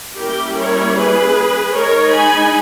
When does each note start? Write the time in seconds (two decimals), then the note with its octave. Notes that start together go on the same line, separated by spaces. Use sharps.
0.18 G3 A#3 C#4 E4 G4 A#4
0.57 A#4 C#5
0.97 G#4 B4
1.75 G#3 D#4 A#4 C#5
2.14 G#5 B5